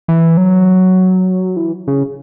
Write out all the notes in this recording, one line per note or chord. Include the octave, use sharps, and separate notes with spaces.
E3
F#3
E3
C#3